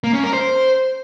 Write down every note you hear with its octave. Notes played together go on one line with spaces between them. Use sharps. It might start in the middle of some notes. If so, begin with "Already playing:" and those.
A#3
C#4
A#4
C5